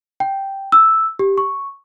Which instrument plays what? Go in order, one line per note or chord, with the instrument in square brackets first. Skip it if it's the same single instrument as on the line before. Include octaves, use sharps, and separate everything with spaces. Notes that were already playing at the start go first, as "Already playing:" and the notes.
[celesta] G5
E6
G4
C#6